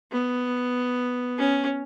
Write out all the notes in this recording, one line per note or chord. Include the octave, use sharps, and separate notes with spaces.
B3
C#4